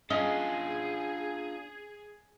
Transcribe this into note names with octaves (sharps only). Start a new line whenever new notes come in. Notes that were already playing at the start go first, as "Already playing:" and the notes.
C#4 D4 F4 G#4 D#5 G#5